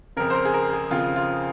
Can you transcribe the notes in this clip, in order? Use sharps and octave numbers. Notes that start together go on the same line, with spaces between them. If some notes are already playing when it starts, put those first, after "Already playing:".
F2 C#3 A#4
C5
A#4
G#4
A#4
G#4
F2 C#3 F4
F4